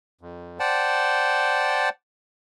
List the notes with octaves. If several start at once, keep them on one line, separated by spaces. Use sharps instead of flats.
F2
C5 D5 F#5 G5 A5